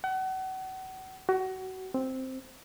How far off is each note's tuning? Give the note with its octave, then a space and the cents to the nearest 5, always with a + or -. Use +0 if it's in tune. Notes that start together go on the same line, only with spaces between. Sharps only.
F#5 +35
F#4 +25
C4 +0